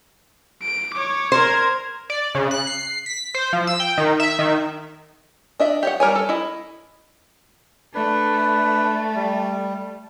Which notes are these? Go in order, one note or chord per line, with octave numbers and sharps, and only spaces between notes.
D7
C#5 D6
A#4 C5 G#6
D5
C#3
F#6
C7
B6
C5
F3
E6
G5
D#3
E5
D#3
D4 D#5 E5
G4 C#5 F#5
G3 A#4 C#5 G#5
A4
E4 D#5
A3 D4 B4
G3